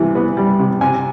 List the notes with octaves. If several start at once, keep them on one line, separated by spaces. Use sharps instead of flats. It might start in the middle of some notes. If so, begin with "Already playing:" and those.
Already playing: C3 E3 G3
B3
G3
C3
C3 G#5